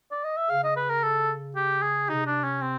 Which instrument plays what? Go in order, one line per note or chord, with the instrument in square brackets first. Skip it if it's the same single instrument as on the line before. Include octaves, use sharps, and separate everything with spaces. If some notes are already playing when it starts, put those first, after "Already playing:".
[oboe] D5
D#5
E5
[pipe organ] C#3 [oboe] F5
[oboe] D#5
B4
A#4
A4
G4
G#4
[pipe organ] C3 [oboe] D#4
[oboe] D4
C#4
C4